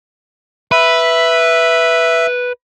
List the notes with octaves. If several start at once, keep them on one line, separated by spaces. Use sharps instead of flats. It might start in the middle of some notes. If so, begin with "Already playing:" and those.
B4 E5